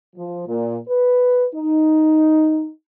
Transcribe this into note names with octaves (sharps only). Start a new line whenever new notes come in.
F3
A#2
B4
D#4